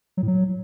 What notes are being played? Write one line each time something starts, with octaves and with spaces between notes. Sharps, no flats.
F#3
A2
F#3